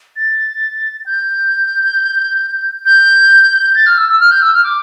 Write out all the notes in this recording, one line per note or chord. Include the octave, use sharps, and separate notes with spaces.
A6
G6
G6
A6
F6
E6
E6
F6
G6
E6
F6
D6